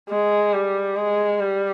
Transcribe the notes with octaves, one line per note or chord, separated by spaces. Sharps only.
G#3
G3
G#3
G3